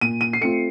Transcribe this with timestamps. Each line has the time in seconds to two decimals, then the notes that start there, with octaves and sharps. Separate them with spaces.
0.01 A#2 D#7
0.21 D#7
0.33 C7
0.41 A3 C4 F4 C#7